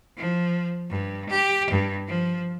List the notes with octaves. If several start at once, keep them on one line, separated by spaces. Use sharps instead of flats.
F3
G2
G4
G2
F3